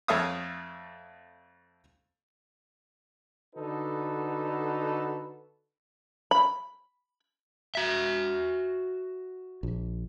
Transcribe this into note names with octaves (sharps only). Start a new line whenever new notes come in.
F2 A3 C#5 E5 F5 D#6
D3 D#4 F#4 A4 B4
B5
F#4 E5
A#1